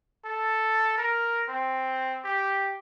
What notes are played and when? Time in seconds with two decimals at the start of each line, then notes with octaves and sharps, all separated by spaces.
0.25 A4
0.98 A#4
1.49 C4
2.24 G4